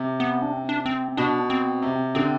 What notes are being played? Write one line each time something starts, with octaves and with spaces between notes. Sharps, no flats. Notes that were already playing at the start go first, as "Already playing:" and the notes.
Already playing: C3
B3
D4
C4
D4
C4
B2 D4
C4
C3
D3 C4